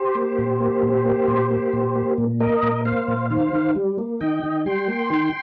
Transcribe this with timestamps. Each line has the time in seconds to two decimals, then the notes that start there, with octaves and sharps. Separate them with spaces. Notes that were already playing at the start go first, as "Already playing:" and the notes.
Already playing: G4 C5
0.15 A#3
0.38 A#2
0.60 A#3
0.83 A#2
1.05 A#3
1.28 A#2
1.50 A#3
1.73 A#2
1.95 A#3
2.18 A#2
2.40 A#3 A#4 D#5
2.63 A#2
2.85 A#3 C5 F5
3.08 A#2
3.30 D#3 C5 F5
3.53 D#3
3.75 G3
3.98 A#3
4.21 D#3 D#5 G5
4.43 D#3
4.66 G3 G5 C6
4.88 A#3
5.10 D#3